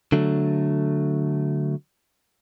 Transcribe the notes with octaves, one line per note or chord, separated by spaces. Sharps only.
D3 F#3 A3